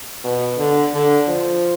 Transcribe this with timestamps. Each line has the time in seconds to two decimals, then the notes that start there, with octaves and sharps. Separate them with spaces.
0.24 B2
0.58 D3
0.93 D3
1.28 F3